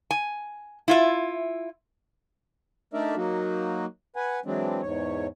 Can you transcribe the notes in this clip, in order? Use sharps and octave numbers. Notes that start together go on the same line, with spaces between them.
G#5
E4 F4 E5
A3 D4 D#4 A#4 D5 E5
F#3 A#3 D#4 F#4
B4 F#5 G#5
E3 F#3 G#3 C4 D4
E2 G#2 C#5